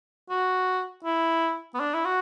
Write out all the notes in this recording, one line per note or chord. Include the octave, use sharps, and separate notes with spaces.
F#4
E4
B3
D4
E4
F#4